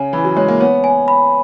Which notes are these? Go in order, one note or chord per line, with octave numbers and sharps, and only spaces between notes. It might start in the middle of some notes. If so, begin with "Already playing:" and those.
Already playing: C#3 C#5 G#5
E3 B5
F#3
G#3 C#5
A#3
B3 C#5
G#5
B5